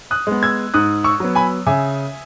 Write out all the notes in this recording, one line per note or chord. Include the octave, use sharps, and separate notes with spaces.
D#6 F#6
G#3 B3
E6 G#6
G#2 D#6 F#6
C#6 E6
F#3 B3
G#5 B5
C#3 E5 G#5